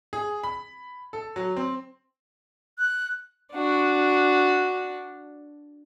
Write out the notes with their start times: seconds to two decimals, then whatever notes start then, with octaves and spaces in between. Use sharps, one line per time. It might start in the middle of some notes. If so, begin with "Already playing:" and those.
0.13 G#4
0.43 B5
1.13 A4
1.36 F#3
1.57 C4
2.79 F#6
3.53 D4 F#4